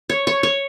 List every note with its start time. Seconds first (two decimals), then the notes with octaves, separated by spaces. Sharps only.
0.10 C#5
0.27 C#5
0.43 C#5